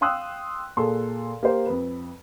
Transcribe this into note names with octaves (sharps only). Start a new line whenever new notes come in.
F5 G5 C6 D#6 E6 F#6
A#2 G#4 A4 C6
A#3 G4 C5
F2 B4